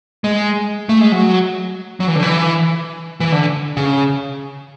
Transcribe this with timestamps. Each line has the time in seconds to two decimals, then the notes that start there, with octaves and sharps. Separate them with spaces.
0.24 G#3
0.89 A3
1.01 G#3
1.12 F#3
2.00 F#3
2.08 E3
2.15 D3
2.23 E3
3.20 E3
3.32 D3
3.77 C#3